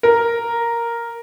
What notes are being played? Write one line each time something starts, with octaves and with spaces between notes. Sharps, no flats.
A#4